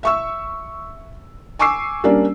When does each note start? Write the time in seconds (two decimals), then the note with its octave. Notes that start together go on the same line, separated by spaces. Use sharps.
0.03 E5 C#6 E6
1.59 G#5 C#6 D6 E6 C7
2.04 G3 A#3 C#4 D4 D5